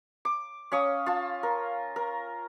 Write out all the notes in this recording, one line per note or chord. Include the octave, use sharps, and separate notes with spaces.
D6
C#4 F5 C#6 D#6
F4 A5
A#4
A#4